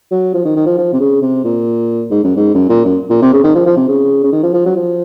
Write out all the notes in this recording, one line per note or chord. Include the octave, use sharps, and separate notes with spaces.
F#3
F3
D#3
D#3
F3
F3
C3
C#3
C3
A#2
G#2
F#2
G#2
F#2
A#2
F#2
A#2
C3
C#3
D#3
F3
F3
C3
C#3
C#3
D#3
F3
F3
F#3
F3